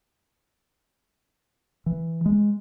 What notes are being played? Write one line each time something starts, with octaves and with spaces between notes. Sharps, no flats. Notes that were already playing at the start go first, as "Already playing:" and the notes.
E3
G#3